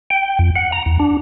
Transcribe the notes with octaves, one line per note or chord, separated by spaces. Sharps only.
G5
F2
F#5
A#5
E2
D4